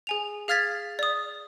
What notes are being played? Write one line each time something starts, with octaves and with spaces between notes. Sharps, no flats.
G#4 G#5 F7
G#4 F5 F6 G#6 A6 B6
D5 D#6